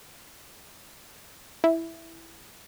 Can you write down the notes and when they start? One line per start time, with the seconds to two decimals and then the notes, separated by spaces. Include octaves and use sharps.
1.64 E4